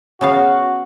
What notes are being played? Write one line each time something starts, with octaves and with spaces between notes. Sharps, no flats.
C#3 B3 F#4 F5